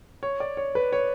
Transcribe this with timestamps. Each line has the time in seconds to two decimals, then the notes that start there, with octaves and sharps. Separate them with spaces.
0.23 C#5
0.40 D5
0.57 C#5
0.75 B4
0.93 C#5